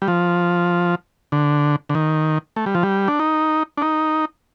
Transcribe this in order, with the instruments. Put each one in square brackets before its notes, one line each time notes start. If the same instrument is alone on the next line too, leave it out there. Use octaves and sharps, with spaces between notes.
[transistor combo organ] G3
F3
D3
D3
D#3
A3
G3
F3
G3
D4
D#4
D4
D#4